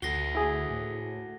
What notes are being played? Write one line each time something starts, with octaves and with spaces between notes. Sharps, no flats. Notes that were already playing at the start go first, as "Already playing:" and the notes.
D2 F#4 A4 A#6 C7 G7
E4 G#4
A2